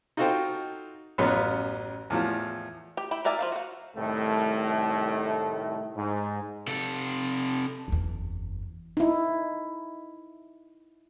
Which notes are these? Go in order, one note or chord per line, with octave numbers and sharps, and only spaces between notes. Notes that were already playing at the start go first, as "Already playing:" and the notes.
D#4 F4 F#4 A4 C5 G5
A1 F#2 B3 F4 C#5 F5
E2 A2 F3
G4
E4 G5
A#3 A#4 D5 E5 G#5
F3 F#3 F5
F#4 F5
C2 A2 D#3 A3
G#2
C3 A4
F#1 E2
D#4 E4